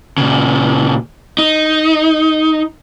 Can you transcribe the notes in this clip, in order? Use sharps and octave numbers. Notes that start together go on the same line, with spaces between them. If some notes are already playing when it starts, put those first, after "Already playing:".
A#2 C#3
D#4